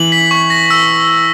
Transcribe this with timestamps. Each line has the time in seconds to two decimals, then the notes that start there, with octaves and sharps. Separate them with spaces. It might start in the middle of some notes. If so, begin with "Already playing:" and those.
Already playing: E3 F#7
0.12 B6
0.31 C#6
0.50 A#6
0.70 E6